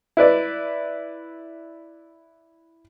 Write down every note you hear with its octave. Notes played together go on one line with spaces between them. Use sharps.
E4 B4 D5